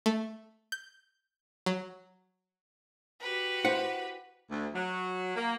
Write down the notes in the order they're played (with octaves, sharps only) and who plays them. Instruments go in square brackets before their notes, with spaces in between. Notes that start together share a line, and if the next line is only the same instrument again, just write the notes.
[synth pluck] A3
G6
F#3
[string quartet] F#4 G4 B4
[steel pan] E4 C5 [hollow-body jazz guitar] F#5
[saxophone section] D2
F#3
A#3